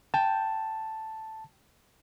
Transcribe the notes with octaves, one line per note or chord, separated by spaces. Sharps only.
G5 A5